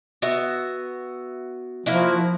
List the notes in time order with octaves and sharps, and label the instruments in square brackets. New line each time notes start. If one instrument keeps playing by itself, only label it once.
[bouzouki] B3 F#4 E5
[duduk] F3 [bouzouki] A#3 E4 F#4